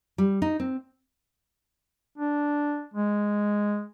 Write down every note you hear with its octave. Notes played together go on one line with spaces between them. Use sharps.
G3
D#4
C4
D4
G#3